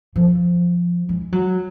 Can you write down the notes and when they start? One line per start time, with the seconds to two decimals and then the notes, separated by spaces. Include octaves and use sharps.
0.16 F3
1.09 G#3
1.32 F#3